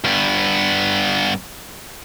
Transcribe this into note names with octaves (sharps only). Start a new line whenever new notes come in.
G2 B3